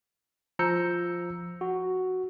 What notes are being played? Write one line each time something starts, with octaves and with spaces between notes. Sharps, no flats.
F3 A#5 E6 G6 C#7
F#4